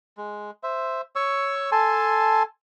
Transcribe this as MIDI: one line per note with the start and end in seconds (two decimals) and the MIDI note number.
0.17 0.51 56
0.63 1.01 72
0.63 1.01 76
1.16 1.70 73
1.16 1.70 85
1.16 1.70 88
1.72 2.43 69
1.72 2.43 80
1.72 2.43 81
1.72 2.43 84